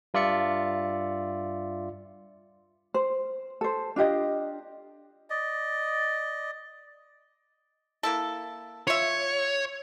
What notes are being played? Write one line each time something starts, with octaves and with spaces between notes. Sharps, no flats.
G2 F4 D5 E5 C#7
C5
A4 C5
D4 F4 G4 D#5
D5 D#5
A#3 E4 A4
F4 C#5 E5